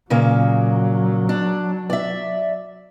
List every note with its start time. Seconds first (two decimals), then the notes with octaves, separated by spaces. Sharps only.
0.10 A#2 C#3 F#3 A#3
1.29 D4
1.90 D5 E5